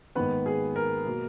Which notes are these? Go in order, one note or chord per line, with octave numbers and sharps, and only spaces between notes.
G#2 D#3 A#3 B3 B4
G#4
A#4
B2 F#3 A#3